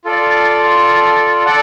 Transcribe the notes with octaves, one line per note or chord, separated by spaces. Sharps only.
F4 A4 D5
A4 D5 F#5